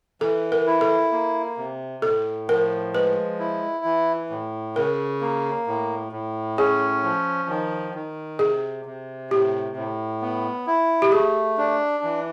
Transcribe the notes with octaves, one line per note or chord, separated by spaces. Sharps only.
E3 A4
A#4
E4
A4
A#3
C3
A2 A4
F3 A#4
G#3 B4
E4
E3
A2
C#3 A#4
A#3
A2
A2
C#4 G#4
F3
D#3
D#3
C3 G#4
C3
A2 G4
A2
B3
E4
G4
A3 G#4
D4
E3